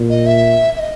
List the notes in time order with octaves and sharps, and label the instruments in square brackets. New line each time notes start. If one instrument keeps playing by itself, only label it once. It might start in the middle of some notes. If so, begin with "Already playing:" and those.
Already playing: [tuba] A#2
[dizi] D#5
E5
E5
D#5